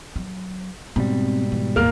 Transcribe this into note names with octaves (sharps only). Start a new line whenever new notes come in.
F#3
G#2 B2 G3 C4
E3
G#1 D#2 A#3 F6